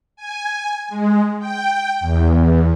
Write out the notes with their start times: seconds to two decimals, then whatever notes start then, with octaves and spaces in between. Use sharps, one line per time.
0.16 G#5
0.88 G#3
1.39 G5
2.00 E2